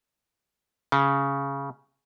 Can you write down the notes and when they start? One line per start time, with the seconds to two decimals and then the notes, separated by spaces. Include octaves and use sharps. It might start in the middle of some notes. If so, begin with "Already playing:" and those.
0.92 C#3